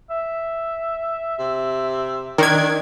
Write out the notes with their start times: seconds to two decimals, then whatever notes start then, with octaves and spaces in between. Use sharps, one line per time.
0.10 E5
1.39 C3
2.38 D#3 D4 G#6